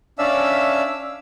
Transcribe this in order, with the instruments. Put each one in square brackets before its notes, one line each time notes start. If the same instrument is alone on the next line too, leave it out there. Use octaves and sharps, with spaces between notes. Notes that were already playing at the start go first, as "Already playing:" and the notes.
[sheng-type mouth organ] C#4 D4 D5 E5 F5 E6